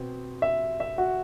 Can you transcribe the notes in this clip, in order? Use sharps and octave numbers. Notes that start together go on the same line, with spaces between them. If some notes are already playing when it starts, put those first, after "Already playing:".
Already playing: B2 C4
E5
E5
F#4 F#5